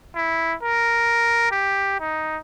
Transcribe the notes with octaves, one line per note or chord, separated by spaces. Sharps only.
E4
A#4
G4
D#4